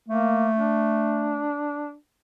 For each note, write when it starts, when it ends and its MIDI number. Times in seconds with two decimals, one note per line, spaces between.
0.08 1.50 57
0.08 0.48 58
0.56 1.93 62